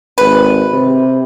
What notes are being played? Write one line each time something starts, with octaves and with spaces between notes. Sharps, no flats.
G#1 B4
C3